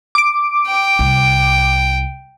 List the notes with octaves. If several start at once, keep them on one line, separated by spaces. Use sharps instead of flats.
D6 D7
G5
C2